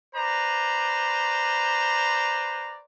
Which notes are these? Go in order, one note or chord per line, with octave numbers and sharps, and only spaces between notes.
B4 C5 D5 A#5